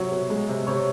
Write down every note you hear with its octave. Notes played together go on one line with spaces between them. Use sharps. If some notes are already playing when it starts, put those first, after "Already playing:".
Already playing: C3 F#3 C#5
B2
G#3
C3
C3 C#5